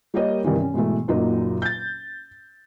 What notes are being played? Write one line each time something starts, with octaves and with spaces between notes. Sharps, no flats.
G3 A#3 G4 A#4 C#5 D#5
G2 C3 D#3 E3
C#4
G#2 B2 E3 A3
F#1 A#2 F#3 D#4
G6 A6